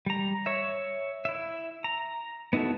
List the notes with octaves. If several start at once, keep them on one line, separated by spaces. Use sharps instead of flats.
G3 A#5
C#5 E5
E4 E5
A#5
B3 D#4 E4 F#4 A4